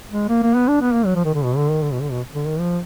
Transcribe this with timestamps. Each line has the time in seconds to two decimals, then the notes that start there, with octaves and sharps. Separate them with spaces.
0.11 G#3
0.29 A#3
0.43 A#3
0.56 B3
0.68 D4
0.81 B3
0.93 A#3
1.06 F#3
1.16 F3
1.25 D#3
1.34 D3
1.44 B2
1.57 D3
1.70 D#3
1.83 D3
1.93 B2
2.01 D3
2.11 B2
2.34 D3
2.47 D#3
2.60 F3